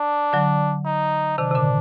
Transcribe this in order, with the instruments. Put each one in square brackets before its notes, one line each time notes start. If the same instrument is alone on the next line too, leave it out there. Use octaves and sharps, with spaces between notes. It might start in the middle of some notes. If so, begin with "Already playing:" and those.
Already playing: [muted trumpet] D4
[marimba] D3 F#3
[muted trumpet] D#4
[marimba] C3 D#3 [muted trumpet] D4
[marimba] C3
A#2 D3